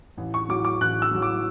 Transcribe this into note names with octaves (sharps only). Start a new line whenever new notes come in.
A1
C#6
A2 F#3 D6
D6
A1 F#6
E6
A2 F#3
D6